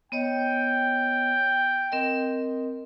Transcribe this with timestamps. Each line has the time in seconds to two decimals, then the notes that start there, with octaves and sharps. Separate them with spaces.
0.12 B3 C#5 D#5 G5
1.92 C4 A#4 D#5